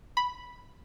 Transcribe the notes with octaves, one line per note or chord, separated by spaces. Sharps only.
B5